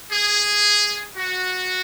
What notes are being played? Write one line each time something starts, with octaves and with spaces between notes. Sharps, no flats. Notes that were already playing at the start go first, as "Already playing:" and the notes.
G#4
F#4